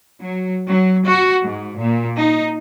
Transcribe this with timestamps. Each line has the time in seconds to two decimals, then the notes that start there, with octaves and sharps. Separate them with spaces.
0.21 F#3
0.68 F#3
1.07 F#4
1.44 G#2
1.80 A#2
2.17 D#4